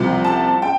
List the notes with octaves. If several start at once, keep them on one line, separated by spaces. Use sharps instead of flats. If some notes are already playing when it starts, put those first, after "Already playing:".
Already playing: C2 C3 F3
A5
G5